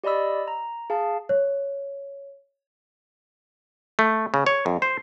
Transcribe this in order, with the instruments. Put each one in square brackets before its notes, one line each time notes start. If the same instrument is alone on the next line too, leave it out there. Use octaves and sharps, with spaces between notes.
[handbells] G4 D5 D#5 B5 E6
A#5
G#4 F5 A5
[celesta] C#5
[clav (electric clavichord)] A3
C#3
C#5
F2
C5